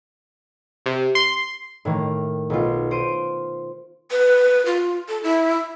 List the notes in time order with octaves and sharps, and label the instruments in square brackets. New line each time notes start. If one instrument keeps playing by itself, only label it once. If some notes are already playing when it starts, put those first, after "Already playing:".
[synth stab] C3
C6
[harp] A2 D#3 A#3
B1 F4
C5 D7 D#7
[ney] B4
F4
A4
E4